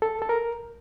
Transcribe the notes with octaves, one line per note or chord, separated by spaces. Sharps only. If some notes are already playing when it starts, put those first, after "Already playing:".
A4
A4
A#4